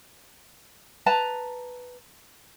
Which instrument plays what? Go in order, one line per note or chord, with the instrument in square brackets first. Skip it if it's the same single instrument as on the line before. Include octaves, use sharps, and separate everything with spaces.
[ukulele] B4 A5 A#5